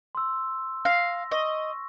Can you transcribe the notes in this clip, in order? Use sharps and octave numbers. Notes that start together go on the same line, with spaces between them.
C6 E6
F5 A#6
D#5 C#6